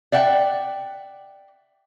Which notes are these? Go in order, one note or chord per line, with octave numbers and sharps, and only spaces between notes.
D5 E5 F#5 G5